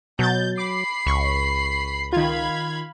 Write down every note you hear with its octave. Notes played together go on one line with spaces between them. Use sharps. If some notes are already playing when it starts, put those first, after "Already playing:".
B2 F#3 G6 A6
B5 D6 C7
C#2 C#6
D#3 F4 F5 B5 G#6